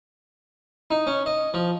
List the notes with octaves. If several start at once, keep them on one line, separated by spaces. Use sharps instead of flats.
D#4
C#4
D#5
F3